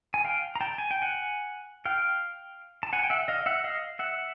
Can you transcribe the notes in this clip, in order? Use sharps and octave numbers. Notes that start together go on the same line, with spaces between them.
G#5
F5 G5
A#5
G5 A5
G#5
G5
F#5 G#5
F5 G5
A5
F#5 G#5
G5
E5 F#5
D#5 F5
E5 F#5
D#5 F5
E5 F#5